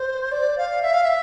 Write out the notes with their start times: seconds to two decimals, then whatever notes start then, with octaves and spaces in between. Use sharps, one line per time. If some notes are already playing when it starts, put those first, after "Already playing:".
Already playing: C5
0.32 D5
0.58 F5
0.83 E5
0.94 F5
1.05 E5